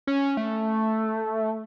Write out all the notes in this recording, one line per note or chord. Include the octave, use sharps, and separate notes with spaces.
C#4
A3